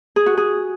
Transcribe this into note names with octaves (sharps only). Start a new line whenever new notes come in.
G#4
F#4
G#4